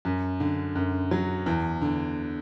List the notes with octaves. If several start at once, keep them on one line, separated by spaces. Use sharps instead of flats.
F#2
D3
F#2
F#3
E2
D3